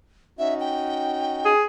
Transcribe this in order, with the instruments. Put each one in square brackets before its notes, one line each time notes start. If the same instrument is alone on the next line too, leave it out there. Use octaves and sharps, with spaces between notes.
[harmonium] C#4 D#4 F#4 [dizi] E5
[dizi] G5
[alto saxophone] G#4